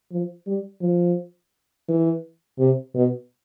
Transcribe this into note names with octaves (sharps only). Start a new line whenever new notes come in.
F3
G3
F3
E3
C3
B2